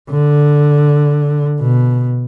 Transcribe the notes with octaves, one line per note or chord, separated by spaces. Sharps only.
D3
B2